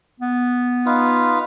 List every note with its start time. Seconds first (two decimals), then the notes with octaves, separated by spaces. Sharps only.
0.20 B3
0.86 D#4 F4 B4